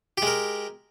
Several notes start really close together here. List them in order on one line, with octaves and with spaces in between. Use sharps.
G4 G#3 A#4